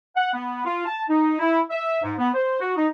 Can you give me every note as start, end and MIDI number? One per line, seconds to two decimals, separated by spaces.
0.16 0.32 78
0.33 0.63 59
0.65 0.84 65
0.86 1.02 81
1.08 1.35 63
1.39 1.59 64
1.70 2.00 76
2.02 2.13 44
2.18 2.28 59
2.34 2.59 72
2.61 2.72 66
2.76 2.86 63